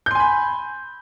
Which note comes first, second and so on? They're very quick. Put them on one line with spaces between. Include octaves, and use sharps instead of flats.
G6 C6 G#5 B5